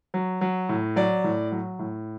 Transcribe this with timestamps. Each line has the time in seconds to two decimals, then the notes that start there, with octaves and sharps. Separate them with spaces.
0.14 F#3
0.41 F#3
0.69 A2
0.96 F#3 D5
1.24 A2
1.52 F#3
1.79 A2